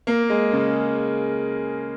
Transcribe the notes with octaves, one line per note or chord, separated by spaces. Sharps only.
A#3
G#3
C#3